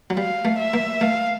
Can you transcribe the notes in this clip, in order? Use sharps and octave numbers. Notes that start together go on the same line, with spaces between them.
F#3
G3 F5
A3
E5
A#3
A3 F5